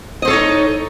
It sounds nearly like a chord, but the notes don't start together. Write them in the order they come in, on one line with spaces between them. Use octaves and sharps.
D#5 C5 A4 C#5 D#4